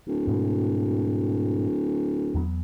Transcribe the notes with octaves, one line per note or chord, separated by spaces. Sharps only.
D1
G#2 B2
E2 F#3 B3